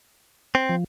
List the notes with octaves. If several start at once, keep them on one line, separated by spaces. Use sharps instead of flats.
C4
F3